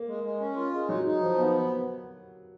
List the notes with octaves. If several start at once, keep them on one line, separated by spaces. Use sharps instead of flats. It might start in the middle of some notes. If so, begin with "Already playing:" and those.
Already playing: A#3
G#3
G#3
C#4
F4
G#3
F#3 D#4
D#4
F3
B3